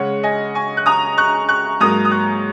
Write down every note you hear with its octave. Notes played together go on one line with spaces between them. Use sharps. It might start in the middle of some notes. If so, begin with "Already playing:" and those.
Already playing: C#3 G#3 C#5 F#5
D#5 G#5
G#5 C#6
F#6
A#5 D#6
C#6 F#6
C#6 F#6
G#2 F#3 A#3 A#5 D#6
D#6
C#6 F#6